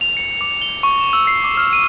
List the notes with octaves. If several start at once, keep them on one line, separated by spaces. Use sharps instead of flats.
F7
C#7
D6
G7
C#6
E7
E6
C7
D6
F6
D#7